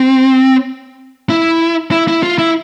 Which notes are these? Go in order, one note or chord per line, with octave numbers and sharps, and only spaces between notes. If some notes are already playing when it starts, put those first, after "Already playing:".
Already playing: C4
E4
E4
E4
F4
E4